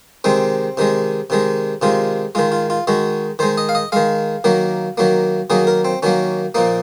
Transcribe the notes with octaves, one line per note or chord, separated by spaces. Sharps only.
C3 D#3 G#3 C4
C3 D#3 G#3
C3 D#3 G#3
C3 D#3 G#3 F4
D#3 G#3 F4
F4
F4
D#3 G#3 F#4
D#3 G#3 C5
D#5
F5
D#5
D#3 G#3 F5
D#3 F#3 A#3
D#3 F#3 A#3
D#3 F#3 A#3 G#4
A#4
C4
D#3 F#3 A#3 C#4
A#2 F3 A#3 D#4